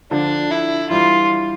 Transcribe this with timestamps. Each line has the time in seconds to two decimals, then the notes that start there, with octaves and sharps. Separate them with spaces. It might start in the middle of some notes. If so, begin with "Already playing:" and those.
0.11 D3 F3 D4
0.51 E4
0.90 E3 G3 F4